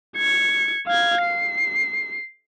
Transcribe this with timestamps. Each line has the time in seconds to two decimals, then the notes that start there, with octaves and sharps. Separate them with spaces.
0.17 G#6 C#7
0.87 F5 G#6
1.22 C7